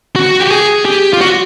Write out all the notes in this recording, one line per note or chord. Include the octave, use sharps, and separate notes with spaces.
F#4
G4
G#4
G4
F4
F#4